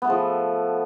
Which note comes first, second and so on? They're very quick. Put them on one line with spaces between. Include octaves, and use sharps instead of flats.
B3 A3 A4 F3